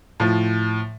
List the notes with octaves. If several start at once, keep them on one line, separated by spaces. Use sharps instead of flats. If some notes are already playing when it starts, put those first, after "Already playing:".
A2 F3